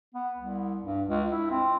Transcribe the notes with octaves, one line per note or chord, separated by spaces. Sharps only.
B3
C2
G2
C#2
E4
C4